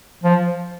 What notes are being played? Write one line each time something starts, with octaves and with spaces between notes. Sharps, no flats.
F3